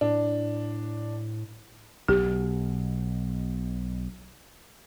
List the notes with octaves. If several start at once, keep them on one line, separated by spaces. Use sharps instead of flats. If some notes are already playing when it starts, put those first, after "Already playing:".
A2 D4
B1 B2 G4